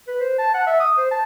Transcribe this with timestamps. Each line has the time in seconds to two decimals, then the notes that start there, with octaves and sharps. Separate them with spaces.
0.07 B4
0.20 C5
0.38 A5
0.54 F#5
0.67 E5
0.80 D#6
0.98 C5
1.11 A5